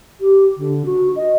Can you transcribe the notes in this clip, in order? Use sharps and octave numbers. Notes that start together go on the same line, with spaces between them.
G4
D3
F#4
D#5